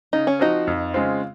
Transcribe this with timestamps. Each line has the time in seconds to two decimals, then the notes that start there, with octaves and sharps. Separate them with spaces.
0.13 C#3 D#4
0.27 C#4
0.40 F3 C4 D#4 F#4
0.67 F2
0.94 C#3 G#3 C4 F4